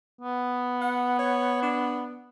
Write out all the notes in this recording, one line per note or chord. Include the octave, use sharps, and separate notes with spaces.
B3
F#5
C#5
D4